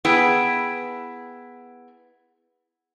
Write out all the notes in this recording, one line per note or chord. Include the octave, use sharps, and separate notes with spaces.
B3 E4 G#4 B4 G5